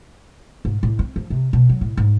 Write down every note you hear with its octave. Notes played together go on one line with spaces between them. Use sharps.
G#2
A2
C4
F3
C3
B2
F#3
A2
G#2